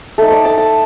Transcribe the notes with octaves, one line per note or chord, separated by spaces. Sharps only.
A3 D#4 A4
D5
A5
A5